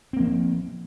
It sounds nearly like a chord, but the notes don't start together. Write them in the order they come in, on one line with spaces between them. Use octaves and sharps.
C4 A#3 F3